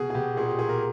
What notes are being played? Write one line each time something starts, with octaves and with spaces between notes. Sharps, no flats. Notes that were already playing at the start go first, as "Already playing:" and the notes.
Already playing: B2 G#4
G#4
B2 G4
A#2 G#4
G4
A#2 G#4
A#4